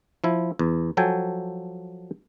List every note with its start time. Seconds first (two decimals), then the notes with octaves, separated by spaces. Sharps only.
0.24 F3 E4
0.59 E2
0.97 F3 F#3 A4 G5 G#5